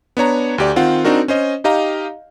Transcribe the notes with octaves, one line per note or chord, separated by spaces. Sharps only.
B3 D4 C#5 A#5
D2 G4 D5
D#3 C4 F4 F#5
C4 D4 D#4 F#4 A#4
C#4 C5 D#5
D#4 G4 D#5 F5 A#5